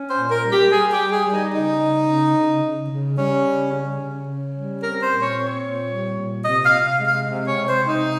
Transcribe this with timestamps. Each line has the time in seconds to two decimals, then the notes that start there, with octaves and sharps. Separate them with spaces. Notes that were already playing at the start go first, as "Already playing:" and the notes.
Already playing: C#4
0.10 C5
0.17 A#2
0.31 A#4
0.44 G3
0.52 G4
0.71 G3 G#4
0.93 G4
0.99 G3
1.12 G#4
1.26 G3
1.33 D#4
1.54 C#3 D#4
1.81 C#3
2.08 C#3
2.35 C#3
2.63 C#3
2.90 C#3
3.17 G3 C#4
3.45 C#3
3.72 C#4
4.00 C#3
4.27 C#4
4.54 G3
4.81 C4 A#4
5.02 C5
5.09 A#2
5.22 C#5
5.36 C4
5.43 C#5
5.63 A#2
5.91 G3
6.18 A#2
6.45 C3 D#5
6.65 F5
6.73 C3
6.87 F5
7.01 G#3
7.07 F5
7.27 C3
7.48 C#5
7.54 C3
7.68 C5
7.82 C3
7.88 D#4